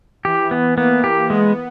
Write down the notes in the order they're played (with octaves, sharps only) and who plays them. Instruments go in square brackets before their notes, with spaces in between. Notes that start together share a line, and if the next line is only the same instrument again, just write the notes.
[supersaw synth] E3 [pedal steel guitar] G4
[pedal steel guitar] B3
[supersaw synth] A#3 [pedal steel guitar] B3
[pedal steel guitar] G4
[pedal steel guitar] G#3 [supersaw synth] B3